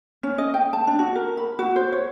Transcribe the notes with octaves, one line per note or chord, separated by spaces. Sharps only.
C#4
D#5
G5
A5
D4
F#4
A#4
B5
F#4
C5
C#5